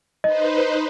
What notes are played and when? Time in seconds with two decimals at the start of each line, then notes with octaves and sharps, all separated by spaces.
0.24 D#4 B4 C5 D#5